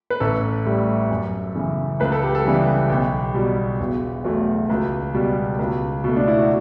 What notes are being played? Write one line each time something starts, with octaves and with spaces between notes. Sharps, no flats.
B4
A1 A4
A2 G3
F#2
C#3 E3
C#2 B4
A4
G4
A4
C#3 E3 G3
B1 G4
B2 G3
E1
E2 B2 F#3 A3
C#2
B2 G3
C#2
B2 A3
D4
E4
F#4